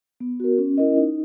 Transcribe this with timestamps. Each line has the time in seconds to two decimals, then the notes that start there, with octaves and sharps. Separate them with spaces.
0.20 B3
0.40 F#4 A#4
0.58 C#4
0.78 E4 A#4 D#5
0.97 D#4